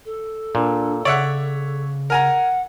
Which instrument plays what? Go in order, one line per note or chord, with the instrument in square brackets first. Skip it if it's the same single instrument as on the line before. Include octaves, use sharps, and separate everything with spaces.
[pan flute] A4
[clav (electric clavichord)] A#2 [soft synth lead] D4
[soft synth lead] C#3 [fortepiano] C#5 E5 F#5 [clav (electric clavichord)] D5
[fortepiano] A#4 G#5 A#5 [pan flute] F#5